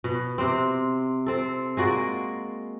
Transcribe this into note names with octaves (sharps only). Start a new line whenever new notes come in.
B2
C3 C4
C4 A4
G#3 A#3 F#4 D5